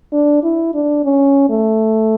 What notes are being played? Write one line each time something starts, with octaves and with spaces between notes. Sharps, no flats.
D4
E4
D4
C#4
A3